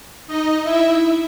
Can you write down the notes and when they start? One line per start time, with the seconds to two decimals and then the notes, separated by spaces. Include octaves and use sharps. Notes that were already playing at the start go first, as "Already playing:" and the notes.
0.27 D#4 D#5
0.64 E4 E5